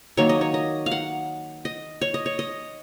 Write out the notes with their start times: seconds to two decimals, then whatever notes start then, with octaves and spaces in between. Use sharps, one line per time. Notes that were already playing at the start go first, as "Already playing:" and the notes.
0.17 D#3 F#3 A#3 C#5
0.29 D#5
0.41 C#5
0.54 D#5
0.86 F5
0.91 F#5
1.65 D#5
2.01 C#5
2.14 D#5
2.26 C#5
2.39 D#5